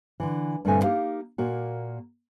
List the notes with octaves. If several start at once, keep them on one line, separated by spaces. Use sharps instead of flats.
D3 E3
G2 A#2 D3 A3 C4 G#5
A#3 D#4 G4 F5
A#2 A#3 F#4